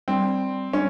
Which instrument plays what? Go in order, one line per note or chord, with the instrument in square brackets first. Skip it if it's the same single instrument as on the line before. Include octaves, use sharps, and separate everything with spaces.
[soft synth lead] G3 [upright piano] C4
[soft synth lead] G3 [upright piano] C#4